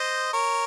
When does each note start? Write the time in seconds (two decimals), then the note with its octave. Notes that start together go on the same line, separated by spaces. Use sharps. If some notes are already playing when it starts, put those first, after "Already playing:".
Already playing: C5 D#5
0.33 A#4 C#5